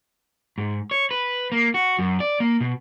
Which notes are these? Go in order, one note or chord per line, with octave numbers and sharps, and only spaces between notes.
G#2
C#5
B4
A#3
F#4
F#2
D5
A#3
B2